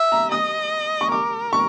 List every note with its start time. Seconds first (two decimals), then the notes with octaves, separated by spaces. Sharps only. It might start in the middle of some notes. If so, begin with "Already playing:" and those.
Already playing: E5
0.12 A#5
0.32 D#5 D#6
1.01 C#6
1.12 A#4 D6
1.53 C#6